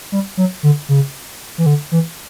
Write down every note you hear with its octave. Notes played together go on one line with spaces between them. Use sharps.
G3
F#3
D3
C#3
E3
D3
E3